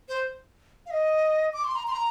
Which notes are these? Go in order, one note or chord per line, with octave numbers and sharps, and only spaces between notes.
C5
F5
D#5
D6
C6
A#5
C6
A#5